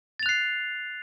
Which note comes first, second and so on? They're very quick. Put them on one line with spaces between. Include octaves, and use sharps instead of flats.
A6 F7 F#6 C7